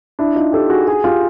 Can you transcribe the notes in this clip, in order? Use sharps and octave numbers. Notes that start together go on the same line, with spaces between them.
D4 E4
D#4 F4
G4 A4
F#4 G#4
F#4 G#4
F4 G4